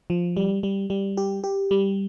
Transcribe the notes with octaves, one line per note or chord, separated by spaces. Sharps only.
F3
G3
G3
G3
G4
G4
G3